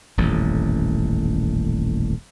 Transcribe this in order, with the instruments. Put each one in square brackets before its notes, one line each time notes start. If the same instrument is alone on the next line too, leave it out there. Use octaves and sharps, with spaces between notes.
[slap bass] D#1 A1 F2